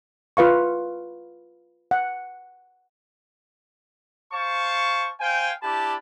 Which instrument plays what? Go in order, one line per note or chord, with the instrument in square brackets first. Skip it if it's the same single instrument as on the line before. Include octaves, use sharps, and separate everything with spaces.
[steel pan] F4 B4 F5 C#6
F#5
[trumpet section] C5 F5 A5 C#6
C5 F5 G5 G#5
D4 E4 G4 A5 B5